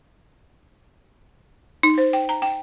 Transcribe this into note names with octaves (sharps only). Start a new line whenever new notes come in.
D#4
C5
G5
A#5
G5